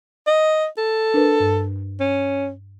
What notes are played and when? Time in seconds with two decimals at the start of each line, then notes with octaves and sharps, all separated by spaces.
0.27 D#5
0.77 A4
1.14 D4 A#4 B4
1.40 G2
2.00 C#4